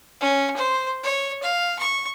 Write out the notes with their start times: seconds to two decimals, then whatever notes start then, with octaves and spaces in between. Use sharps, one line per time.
0.21 C#4
0.57 C5
1.04 C#5
1.43 F5
1.79 C#6